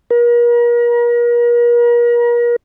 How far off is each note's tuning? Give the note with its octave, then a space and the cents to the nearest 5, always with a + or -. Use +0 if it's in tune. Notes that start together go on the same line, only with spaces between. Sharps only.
A#4 +40